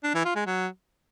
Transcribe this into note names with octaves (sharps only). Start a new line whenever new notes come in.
D4
E3
F4
G#3
F#3